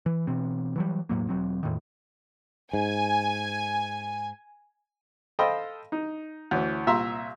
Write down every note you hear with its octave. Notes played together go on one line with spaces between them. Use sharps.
E3
B2 E3 C4
E3 F#3 G3
E1 A2 F#3 A#3
E1 F#3 C4
E2 A2 D#3
G#2 G#5
A4 C5 D#5 F5 G5 B5
D#4
D2 E3 C#4
C2 A#2 E5 A#5 C6